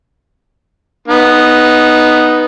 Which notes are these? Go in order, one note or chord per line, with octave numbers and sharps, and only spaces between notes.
B3 D#4